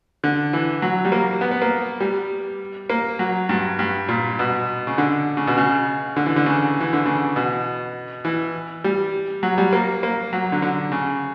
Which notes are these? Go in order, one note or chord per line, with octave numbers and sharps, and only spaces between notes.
D3
E3
F#3
G3
A#3
B3
B3
A#3
G3
A#3
F#3
G2
G2
A#2
B2
C#3
D3
C#3
B2
C#3
D3
E3
D3
C#3
E3
D3
C#3
B2
E3
G3
F#3
G3
A#3
A#3
F#3
D3
D3
C#3